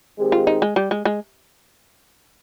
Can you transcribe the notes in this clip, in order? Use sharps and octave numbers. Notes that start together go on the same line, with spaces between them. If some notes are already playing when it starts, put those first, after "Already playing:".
D#3 G#3 C4 G4
F4
D#4
G#3
G3
G#3
G#3